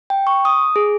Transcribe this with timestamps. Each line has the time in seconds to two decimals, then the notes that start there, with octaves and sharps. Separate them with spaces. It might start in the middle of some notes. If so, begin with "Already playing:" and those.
0.10 G5
0.27 C#6
0.45 D#6
0.76 G#4